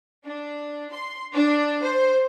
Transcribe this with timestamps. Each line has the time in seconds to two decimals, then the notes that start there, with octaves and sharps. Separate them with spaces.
0.23 D4
0.92 C6
1.33 D4
1.82 C5